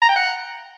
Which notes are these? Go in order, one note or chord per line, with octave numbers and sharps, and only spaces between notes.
A#5
G5
F#5